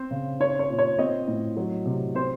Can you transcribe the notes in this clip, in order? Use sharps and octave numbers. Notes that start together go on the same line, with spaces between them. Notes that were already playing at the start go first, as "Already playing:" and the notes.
Already playing: C4 C5
C#3
C#4 C#5
C#5
A#2
C#5
C4 D#5
A2
F#3
C3
C4 C5